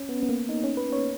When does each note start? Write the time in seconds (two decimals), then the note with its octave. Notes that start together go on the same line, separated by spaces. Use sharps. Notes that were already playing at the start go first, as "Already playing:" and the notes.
Already playing: C#4
0.09 B3
0.23 B3
0.29 A#3
0.49 D#4
0.64 C#4
0.77 B4
0.93 C#5